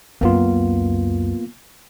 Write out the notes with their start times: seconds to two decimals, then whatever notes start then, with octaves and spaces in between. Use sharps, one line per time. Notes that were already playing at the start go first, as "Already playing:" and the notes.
0.21 C#2 F#2 A#3 B3 F4